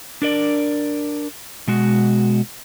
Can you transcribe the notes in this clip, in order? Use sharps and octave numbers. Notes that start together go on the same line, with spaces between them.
D4 A#4 D5
B2 G#3 F#4